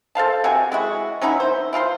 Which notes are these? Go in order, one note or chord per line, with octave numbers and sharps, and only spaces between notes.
A4 C5 F5 A5
C3 F#4 G#5
G#3 E4 F#4
F#3 C#4 D#4 E4
C5
E4 F4 A4 C5